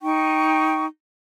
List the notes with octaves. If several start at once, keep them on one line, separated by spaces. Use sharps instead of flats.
D#4 G5 C#6